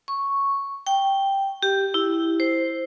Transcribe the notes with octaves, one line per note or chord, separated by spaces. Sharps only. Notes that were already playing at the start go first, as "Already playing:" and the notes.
C#6
G5
G4
E4
C5